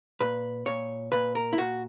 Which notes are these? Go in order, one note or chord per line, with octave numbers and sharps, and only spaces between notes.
A#2 B4
A#2 C#5
A#2 B4
A#4
E4
A#2 F#4